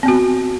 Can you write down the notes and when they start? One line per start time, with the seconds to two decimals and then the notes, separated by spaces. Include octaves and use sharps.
0.03 C4
0.06 B3
0.08 F#4